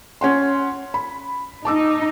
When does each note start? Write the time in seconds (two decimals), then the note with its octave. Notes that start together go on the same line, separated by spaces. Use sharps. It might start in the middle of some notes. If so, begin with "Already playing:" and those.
0.21 C#4 F#5 C6
0.94 B5
1.65 D#4 A5 D6 E6